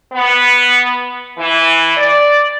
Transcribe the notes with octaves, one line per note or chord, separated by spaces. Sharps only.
B3
E3
D5